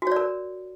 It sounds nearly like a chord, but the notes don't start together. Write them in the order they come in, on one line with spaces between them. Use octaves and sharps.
F#4 C#5 D5 A#4